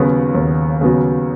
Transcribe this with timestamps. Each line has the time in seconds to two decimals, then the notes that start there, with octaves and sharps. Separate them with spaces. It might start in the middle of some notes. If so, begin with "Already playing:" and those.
Already playing: D#2 C#3 F#3 B3 F#4
0.35 D#2
0.81 C#3 F#3 B3 F#4